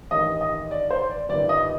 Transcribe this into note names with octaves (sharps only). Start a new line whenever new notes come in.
A1 G2 D#3 D#5
D#5
D5
C5
D5
G1 G2 D#3 D5
D#5